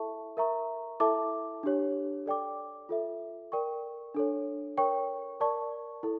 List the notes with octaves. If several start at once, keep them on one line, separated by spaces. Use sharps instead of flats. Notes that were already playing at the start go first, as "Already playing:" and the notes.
Already playing: E4 A4 E5 A5 C#6
A#4 E5 A#5 C#6
E4 A4 E5 A5 D6
D4 G4 C#5
A4 D5 G5 D6
F4 A4 E5
A#4 D5 G5 C#6
D4 A4 C#5
A#4 C#5 G5 C#6
A#4 D5 A5 C#6
E4 A4